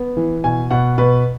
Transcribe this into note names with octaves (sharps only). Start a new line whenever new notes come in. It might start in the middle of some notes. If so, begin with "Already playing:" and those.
Already playing: B3
E3
B2 G#5
B2 F#5
B2 B4